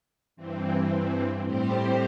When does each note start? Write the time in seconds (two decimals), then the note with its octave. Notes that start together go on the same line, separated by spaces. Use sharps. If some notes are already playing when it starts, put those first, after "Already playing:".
0.36 G2 E3 C4
1.43 A2 G3 C4 G4 C5